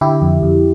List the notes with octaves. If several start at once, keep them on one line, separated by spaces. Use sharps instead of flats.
D3 E4 G4
F2
F2